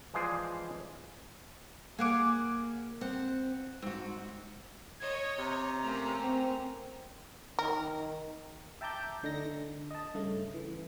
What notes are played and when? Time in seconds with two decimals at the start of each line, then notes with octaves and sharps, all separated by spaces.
0.14 E3 F3 G#3 G#4 C5 D5
1.99 A#3 G#4 F#5 D6
3.01 C4 F#5
3.82 G#2 C4 F#4
5.00 C#5 D#5 G#6
5.38 C3 A#5
5.82 A3 A#3 C#4
6.23 C4
7.59 D#3 A#4
8.81 E5 G5 A5 A#5 D6 G6
9.23 D2 D3 D#4 A#6
9.46 D3
9.91 D#5 A5
10.14 G2 C#3 A3
10.54 E3